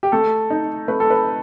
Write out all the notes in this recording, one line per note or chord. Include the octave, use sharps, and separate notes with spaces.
G4
A3 A4
D#4
A3 B4
A4
B4